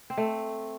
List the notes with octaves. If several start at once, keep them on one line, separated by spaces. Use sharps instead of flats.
C4
A3